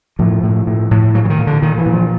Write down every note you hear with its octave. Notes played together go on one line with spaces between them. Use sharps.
A2 F3
A2
A2
A2
A#2 F#3
E3
D#3
A#2
D3
A#2 D#3
E3
A#2
F3